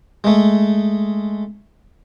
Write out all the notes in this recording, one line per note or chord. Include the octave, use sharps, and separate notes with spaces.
G#3 A3